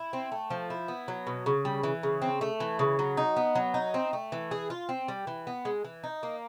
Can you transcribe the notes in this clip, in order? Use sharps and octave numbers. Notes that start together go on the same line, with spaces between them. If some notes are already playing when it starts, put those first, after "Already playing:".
Already playing: E4
C4
A3
F3
E4
B3
F#3
B2
C#3
G3
E3
C#3
C4
A3
E3
C#3
F#3
D#4
B3
F#3
D#4
C4
A3
E3
G#4
F4
C4
G3
E3
B3
G#3
E3
D#4
A#3